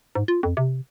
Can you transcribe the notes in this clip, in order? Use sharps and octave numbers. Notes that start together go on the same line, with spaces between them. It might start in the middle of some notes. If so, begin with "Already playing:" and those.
G#2
F4
F2
C3